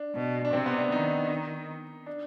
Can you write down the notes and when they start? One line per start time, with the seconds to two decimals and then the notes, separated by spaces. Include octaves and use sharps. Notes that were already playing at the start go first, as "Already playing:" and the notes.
Already playing: D4
0.15 B2
0.45 D4
0.53 C3 C4
0.66 B3
0.78 D4
0.92 D#3 D#4
1.30 D#4
2.06 D4